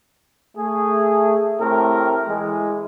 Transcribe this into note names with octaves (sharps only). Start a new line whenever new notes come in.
A3 G#4
A2 A3 C4 G4 A#4
E3 G#3